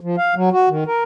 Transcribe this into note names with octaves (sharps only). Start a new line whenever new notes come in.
F3
F5
F#3
F#4
D#3
A#4